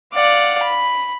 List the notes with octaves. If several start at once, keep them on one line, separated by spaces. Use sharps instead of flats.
D5 F5 F#5
B5